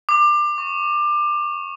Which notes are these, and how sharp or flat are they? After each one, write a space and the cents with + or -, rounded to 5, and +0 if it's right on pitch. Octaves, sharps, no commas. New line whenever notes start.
D6 +25
C#6 -10